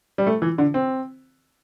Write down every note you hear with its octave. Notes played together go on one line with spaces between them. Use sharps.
G3
A3
E3
D3
C4